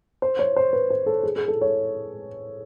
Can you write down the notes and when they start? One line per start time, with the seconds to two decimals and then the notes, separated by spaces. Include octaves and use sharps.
0.22 C5
0.39 C#5
0.56 C5
0.73 B4
0.90 C5
1.06 A4
1.23 G#4
1.36 G#4
1.48 A4
1.61 C#5